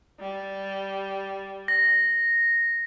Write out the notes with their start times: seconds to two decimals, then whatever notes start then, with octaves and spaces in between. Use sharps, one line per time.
0.20 G3
1.68 A#6